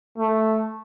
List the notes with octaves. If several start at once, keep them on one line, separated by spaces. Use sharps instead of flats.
A3